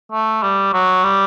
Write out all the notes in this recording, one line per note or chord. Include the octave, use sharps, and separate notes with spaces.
A3
G3
F#3
G3